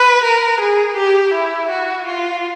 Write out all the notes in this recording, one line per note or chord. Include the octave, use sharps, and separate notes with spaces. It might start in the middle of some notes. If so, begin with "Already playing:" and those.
Already playing: B4
A#4
G#4
G4
E4
F#4
F4